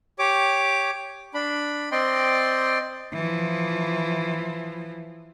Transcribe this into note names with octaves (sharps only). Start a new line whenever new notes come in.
G4 C#5 D6
D4 B5
C4 D5 D#5 G5 C6
E3 F3